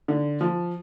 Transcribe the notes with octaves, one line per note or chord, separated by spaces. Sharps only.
D3
F3